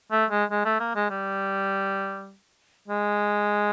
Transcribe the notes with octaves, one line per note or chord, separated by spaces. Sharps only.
A3
G#3
G#3
A3
A#3
G#3
G3
G#3